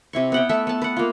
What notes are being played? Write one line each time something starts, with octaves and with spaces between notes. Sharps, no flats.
C3 E4 C#6
B3 F#5 G5
A3 A4 E5
B3 A5
B4 F#5
A#3 F4